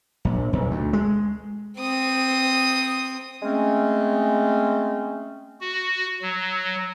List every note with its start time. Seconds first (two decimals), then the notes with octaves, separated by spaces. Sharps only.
0.25 A#1
0.53 B1
0.71 D2
0.93 G#3
1.79 C4 D#6
3.42 G#3 A3 C4 C#4
5.60 F#4
6.22 F#3